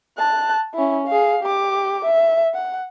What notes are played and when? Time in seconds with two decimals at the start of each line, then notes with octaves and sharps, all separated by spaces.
0.18 A5 F#6
0.75 C#4 E4
1.07 G#4 F5
1.43 G4 D6
2.05 E5
2.54 F#5